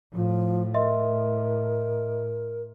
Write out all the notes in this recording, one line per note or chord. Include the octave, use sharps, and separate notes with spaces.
A2 F3
A#4 D#5 E5 C6